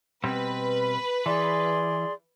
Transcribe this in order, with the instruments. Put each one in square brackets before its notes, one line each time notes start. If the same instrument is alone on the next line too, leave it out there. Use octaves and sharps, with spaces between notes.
[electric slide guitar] B2 G3 C4 [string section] B4
[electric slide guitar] E3 [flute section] G#4 D5 C6